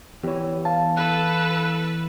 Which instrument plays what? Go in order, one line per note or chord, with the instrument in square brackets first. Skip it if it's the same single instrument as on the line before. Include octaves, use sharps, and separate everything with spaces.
[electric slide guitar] E2 E3 [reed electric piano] G4 C#5
[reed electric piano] F5 A5
[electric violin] A4 B4 [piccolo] F#6